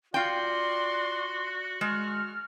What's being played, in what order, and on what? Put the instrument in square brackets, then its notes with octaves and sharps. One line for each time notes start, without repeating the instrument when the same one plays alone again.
[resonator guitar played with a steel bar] F4 G5 [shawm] F#4 [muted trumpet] D5 [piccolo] C6
[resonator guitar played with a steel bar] G#3 [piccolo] F6